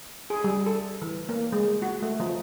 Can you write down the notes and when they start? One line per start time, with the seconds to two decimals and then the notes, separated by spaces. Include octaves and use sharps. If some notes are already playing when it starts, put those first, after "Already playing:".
0.30 G#4
0.44 G3
0.66 A4
1.02 E3
1.29 A#3
1.52 G#3
1.82 F#4
2.02 A3
2.20 F3